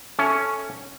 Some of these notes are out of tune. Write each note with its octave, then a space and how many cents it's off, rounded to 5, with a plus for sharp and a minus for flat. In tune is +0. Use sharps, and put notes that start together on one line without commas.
C#4 +0 A4 -5 E5 +0